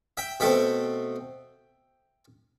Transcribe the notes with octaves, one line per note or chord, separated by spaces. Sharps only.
E5 G5
B2 A3 C4 E5 G5